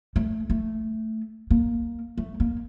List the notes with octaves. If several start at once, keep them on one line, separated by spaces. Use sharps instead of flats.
A3
A3
A#3
A3
A#3